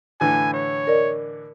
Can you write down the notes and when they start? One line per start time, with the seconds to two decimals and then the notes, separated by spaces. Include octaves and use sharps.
0.21 A2 D3 E3 G#5
0.54 C#5
0.87 A#4 D5 D#5